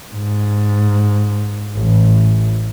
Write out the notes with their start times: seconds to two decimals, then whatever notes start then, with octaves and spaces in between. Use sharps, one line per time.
0.14 G#2
1.80 A1